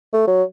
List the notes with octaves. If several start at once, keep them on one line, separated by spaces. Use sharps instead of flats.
A3
F#3